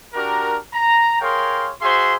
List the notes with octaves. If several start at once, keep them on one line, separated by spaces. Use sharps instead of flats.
D4 F#4 G4 A#4
A#5
G#4 A#4 C#5 F5 G5 C6
F#4 G#4 C5 E5 C6